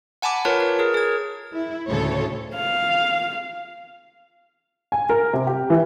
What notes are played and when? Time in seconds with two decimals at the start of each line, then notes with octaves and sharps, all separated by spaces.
0.22 F#5 G#5 A5 B5 D6
0.45 F4 A#4 B4 C#5 A5
0.60 A#4
0.79 G#4 A#4
0.94 G#4 G#6
1.54 E4
1.87 D2 A2 C#3 A4 C#5
2.56 F5
4.92 G#5
5.09 A#4
5.33 C3
5.47 G4
5.70 E3